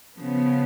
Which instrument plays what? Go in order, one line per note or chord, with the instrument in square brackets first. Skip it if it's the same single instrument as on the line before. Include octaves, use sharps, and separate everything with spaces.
[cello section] C#3 F3 B3